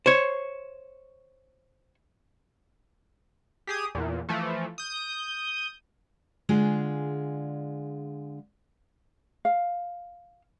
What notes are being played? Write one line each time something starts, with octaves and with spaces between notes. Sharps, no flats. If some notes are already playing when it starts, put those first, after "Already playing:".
C5 C#5
G4 G#4 D#6
E2 A#2
E3 F3 A3
D#6 G6
D3 G#3 F4 G#4
F5